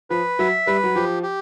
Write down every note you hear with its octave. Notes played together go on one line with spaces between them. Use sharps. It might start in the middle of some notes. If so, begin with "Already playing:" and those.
F3 B4
F#3 E5
G3 B4
F#3
F3 G4
G4